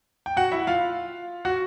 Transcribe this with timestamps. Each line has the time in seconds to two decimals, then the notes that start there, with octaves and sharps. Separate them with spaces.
0.26 G5
0.37 F#4 F#5
0.52 E4 E5
0.67 F4 F5
1.45 F#4 F#5